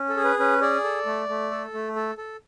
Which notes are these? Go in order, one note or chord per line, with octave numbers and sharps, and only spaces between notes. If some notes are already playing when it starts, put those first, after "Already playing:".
Already playing: C#4
A4
G#4
B4
C#4 B4
G#4 D5
A4
A3
A3
A4
A3
A4
A4